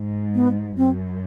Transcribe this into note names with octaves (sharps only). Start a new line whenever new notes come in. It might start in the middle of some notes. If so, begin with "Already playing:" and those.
Already playing: G#2
B3
F#2 C4